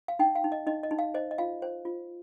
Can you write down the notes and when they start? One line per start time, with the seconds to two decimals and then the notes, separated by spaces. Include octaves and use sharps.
0.08 F5
0.19 D#4 G5
0.35 F5
0.44 D#4
0.52 D#5
0.67 D#4 D#5
0.83 D#5
0.91 D#4
0.99 F5
1.14 C5 D#5
1.31 D#5
1.38 F4 F5
1.62 C5
1.85 F4